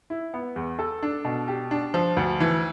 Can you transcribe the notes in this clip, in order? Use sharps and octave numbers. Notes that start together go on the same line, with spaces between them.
E4
B3
E2
A4
D4
B2
G4
D4
F3
D2
E3